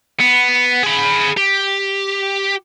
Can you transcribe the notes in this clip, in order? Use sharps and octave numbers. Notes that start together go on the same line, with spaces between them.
B3
G#4 B5
G4